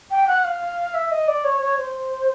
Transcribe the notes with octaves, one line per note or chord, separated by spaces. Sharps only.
G5
F#5
F5
E5
D#5
D5
C#5
C#5
C5